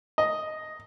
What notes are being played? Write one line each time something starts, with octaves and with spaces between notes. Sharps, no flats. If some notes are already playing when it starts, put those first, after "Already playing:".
D#5